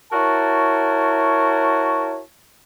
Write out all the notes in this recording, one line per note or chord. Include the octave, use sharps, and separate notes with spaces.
E4 F#4 A#4 C#5 A5